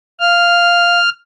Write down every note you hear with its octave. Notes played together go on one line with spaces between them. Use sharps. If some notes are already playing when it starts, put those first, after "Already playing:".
F5 F6